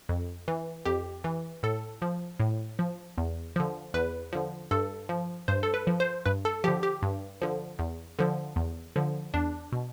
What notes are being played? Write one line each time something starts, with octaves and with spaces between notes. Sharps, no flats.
F2
E3
F2 G4
E3
A2 A4
F3
A2
F3
E2
D3 F3
E2 B4
D3 F3
G2 A4
F3
G2 C5
A4
B4
F3
C5
G2 B4
A4
D3 F3 G4
G4
G2
D3 F3
E2
D3 F3
E2
D3 F3
E2 D4
B2